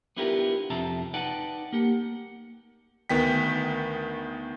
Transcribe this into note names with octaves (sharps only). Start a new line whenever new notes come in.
B3 D4 E4 F4 G4 A#4
F2 C3 F4 E5 A5 A#5
D#4 B4 D5 F#5 G5 A5
A#3 G4 F#5
D2 D#3 B3 G5 B6